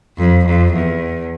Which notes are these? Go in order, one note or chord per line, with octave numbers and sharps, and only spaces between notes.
F2
F2
E2